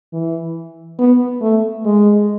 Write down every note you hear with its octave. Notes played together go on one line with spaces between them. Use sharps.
E3
B3
A3
G#3